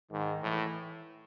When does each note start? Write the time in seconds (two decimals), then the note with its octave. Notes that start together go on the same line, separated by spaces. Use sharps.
0.11 G#2 D#3
0.42 A2 E3